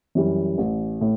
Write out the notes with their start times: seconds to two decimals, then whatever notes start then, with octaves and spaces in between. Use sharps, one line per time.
0.15 F#2 E3 G3
0.58 A1
1.01 A2